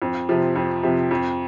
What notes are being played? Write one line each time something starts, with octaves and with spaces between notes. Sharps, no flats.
F2
C3 F3
F2
C3 F3
F2